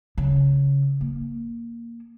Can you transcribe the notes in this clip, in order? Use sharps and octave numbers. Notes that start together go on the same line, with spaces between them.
C#3
A#3